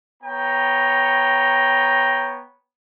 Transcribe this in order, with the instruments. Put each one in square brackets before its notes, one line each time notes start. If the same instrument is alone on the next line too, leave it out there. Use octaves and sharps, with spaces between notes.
[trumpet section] B3 C#5 G5 A#5